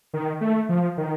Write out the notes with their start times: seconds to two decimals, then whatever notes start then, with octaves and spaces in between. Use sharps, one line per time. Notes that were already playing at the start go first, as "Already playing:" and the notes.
0.13 D#3
0.41 A3
0.69 F3
0.97 D#3